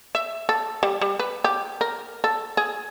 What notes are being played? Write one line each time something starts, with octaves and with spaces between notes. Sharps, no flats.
E5
A4
G3
G3
B4
G4
A#4
A4
G#4